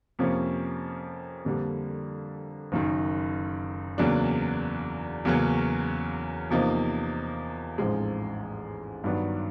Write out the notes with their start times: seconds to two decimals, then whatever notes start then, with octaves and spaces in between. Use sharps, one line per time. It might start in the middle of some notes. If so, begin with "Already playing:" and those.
0.19 F2 C3 F3 A#3 C#4
1.45 F2 D3 G3 A#3
2.72 F#1 F#2 D#3
3.98 E2 C#3 F#3 A#3 D4
5.25 E2 C#3 F#3 A#3 C#4
6.50 E2 C3 F3 A#3 D#4
7.78 A1 G#2 F3 G#3 C4
9.04 G2 D#3 F#3 B3 D4